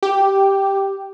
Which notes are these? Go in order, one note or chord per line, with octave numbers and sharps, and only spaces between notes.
G4